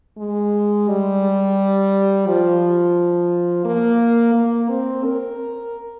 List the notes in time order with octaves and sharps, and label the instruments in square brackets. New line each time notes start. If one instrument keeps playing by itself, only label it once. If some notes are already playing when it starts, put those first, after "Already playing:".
[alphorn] G#3
G3
F3
A#3
A#3
C4
A#4